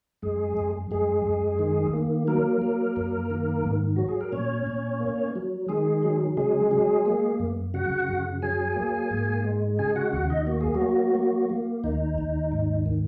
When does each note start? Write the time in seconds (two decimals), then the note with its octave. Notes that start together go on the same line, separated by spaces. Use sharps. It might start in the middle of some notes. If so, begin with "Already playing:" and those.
0.22 F#2 G#3 G#4
0.57 F#2
0.91 F#2 G#3 G#4
1.25 F#2
1.59 D#3
1.93 A#3
2.27 F#3 A#3 A#4
2.62 F#3
2.96 F#2
3.30 D#3
3.64 G#2
3.96 F#3 F#4
4.09 G#4
4.21 A#4
4.32 A#2 C#4 C#5
4.67 A#2
5.00 A#3
5.36 F#3
5.69 D#3 G#3 G#4
6.03 F#3
6.37 C#3 G#3 G#4
6.71 F#3
7.06 A#3
7.40 F#2
7.74 C#3 F#4 F#5
8.08 F#2
8.42 F#3 G#4 G#5
8.76 A#3
9.11 G#2
9.45 G#3
9.79 C#3 G#4 G#5
9.96 F#4 F#5
10.13 D#2 F#4 F#5
10.30 D#4 D#5
10.47 A#3 F#4
10.61 G#4
10.74 F#3 F#4
10.82 A#3
11.15 A#3
11.50 A#3
11.84 D#2 D#4
12.18 D#2
12.52 G#2
12.86 D#3